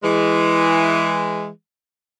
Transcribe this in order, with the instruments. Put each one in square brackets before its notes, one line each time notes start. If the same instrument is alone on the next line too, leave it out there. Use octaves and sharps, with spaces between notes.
[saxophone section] E3 G#3